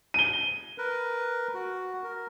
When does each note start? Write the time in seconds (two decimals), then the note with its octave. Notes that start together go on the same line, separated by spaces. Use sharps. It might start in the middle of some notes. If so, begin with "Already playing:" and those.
0.14 D#7 G7
0.78 A#4 B4
1.54 F#4
2.04 A#4